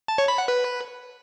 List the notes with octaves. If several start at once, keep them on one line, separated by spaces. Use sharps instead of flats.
A5
C#5
B5
F#5
B4